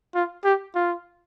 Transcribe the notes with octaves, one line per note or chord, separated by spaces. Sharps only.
F4
G4
F4